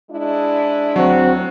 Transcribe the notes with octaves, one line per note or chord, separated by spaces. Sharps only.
G#3 D4 E4
D2 F#3 C4 F#4